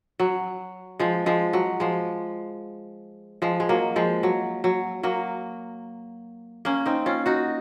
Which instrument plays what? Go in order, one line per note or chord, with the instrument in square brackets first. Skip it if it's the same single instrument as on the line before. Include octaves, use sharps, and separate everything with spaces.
[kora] F#3
F3 G#3
F3 G#3
F#3
F3 G#3
F3 G#3
G#3
F#3 A#3
F3 G#3
F#3
F#3
F#3 A#3
A#3 C#4
C4 D#4
C#4 F4
D#4 F#4